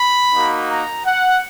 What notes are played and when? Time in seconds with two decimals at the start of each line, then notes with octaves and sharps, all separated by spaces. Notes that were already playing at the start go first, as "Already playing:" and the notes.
Already playing: B5
0.33 A#3 D#4 F#4
0.69 A#5
1.06 F#5